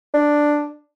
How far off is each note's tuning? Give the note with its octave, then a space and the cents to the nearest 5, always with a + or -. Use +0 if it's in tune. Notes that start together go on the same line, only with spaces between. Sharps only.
D4 +5